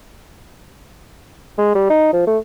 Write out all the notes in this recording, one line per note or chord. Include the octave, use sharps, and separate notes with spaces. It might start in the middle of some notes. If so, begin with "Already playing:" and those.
G#3
G3
D#4
F3
A3